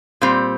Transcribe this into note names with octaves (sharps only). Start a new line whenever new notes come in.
A#2 G3 C4